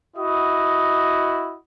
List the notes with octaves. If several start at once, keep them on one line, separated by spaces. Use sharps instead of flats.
E4 F#4 D#5 D#6